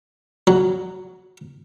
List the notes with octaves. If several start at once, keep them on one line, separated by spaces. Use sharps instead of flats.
F#3